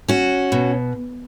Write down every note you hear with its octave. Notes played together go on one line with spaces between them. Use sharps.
C#4 F#4
B2